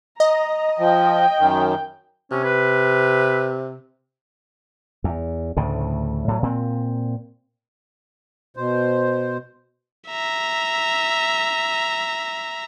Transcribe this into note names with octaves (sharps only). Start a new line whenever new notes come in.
D#5 A#5
F3 G5
F#2 D#3
C3 C#4
B4
E2
D2 A2 C#3
A2 F#3
A#2 C4
B2 C5
E5 A#5